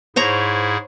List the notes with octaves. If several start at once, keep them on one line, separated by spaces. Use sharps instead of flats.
G#2 E4 G#4 C5 C#5 A#5